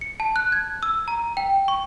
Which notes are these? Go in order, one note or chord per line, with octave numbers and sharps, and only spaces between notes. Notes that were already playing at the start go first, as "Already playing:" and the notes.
C#7
A5
F#6
G#6
E6
A#5
G5
C#6